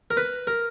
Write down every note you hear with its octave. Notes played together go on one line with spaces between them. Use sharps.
A#4
B4
A#4